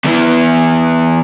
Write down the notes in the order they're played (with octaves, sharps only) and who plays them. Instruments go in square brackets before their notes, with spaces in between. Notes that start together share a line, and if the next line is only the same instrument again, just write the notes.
[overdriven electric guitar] E2 E3